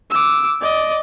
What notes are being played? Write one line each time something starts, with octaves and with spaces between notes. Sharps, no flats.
D6 E6
D5 D#5